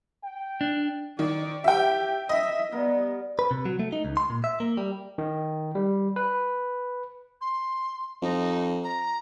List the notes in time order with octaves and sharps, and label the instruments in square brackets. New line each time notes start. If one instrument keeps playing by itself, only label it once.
[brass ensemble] G5
[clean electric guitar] D4
[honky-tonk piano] D#3 [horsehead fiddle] D5
[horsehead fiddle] G4 [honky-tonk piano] E5 G5
[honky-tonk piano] D#5 [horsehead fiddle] E5
[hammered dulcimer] G3 A#4 [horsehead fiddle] B3
[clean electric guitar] B4
C3
F#3
A3
D#4
C#2
C6
A#2
E5
A#3
G3
[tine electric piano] D#3
G3
B4
[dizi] C6
[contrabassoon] F2 [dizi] D#4
[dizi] A#5